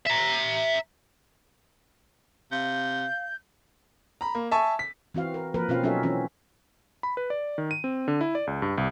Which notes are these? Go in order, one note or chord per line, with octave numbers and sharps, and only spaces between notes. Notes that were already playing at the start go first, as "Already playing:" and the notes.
E5 A#5
C3 F5 G6
A#5 B5
A#3
E5 G#5 A5 C#6
B6
E3 C4 F#4 F5
A#4
F3 A#3 A#4 B4
B2 C4 C#4 F4 F5
F#3 C#4 D#4 F4 A4 E5
E3 C4 C#4
B5
B4
D5
D#3
D#7
C4
D3
E4
D5
C#2
G2
C2